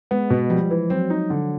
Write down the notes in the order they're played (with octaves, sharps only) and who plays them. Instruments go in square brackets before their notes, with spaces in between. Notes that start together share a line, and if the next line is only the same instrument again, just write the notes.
[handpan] G#3 [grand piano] B3
[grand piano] B2
[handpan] F3 [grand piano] G3
[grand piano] E3
[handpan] F#3 [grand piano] C4
[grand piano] D#4
D3